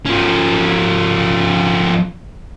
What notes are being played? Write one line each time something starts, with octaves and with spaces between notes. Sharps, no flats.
F3 C#4